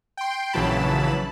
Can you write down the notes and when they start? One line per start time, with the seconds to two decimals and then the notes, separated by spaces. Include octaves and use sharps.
0.17 G5 C6
0.53 A#1 C#3 E3 F#3 A5 B5